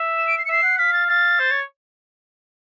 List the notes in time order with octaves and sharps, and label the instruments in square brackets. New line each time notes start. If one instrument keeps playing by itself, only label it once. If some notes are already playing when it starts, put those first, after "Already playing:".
Already playing: [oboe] E5
[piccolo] E7
D7
C7
C#7
[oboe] E5 [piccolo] C7
[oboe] F#5
[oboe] F5 [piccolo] B6
[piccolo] A6
[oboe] F5 [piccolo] A6
[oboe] C5
C#5